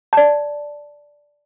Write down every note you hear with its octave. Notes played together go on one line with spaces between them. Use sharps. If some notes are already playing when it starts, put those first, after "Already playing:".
D5 A5